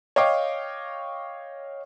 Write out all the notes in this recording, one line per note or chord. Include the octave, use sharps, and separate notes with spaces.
C#5 D#5 F5 G5 D6